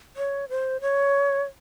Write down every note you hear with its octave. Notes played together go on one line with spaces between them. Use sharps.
C#5
C5
C#5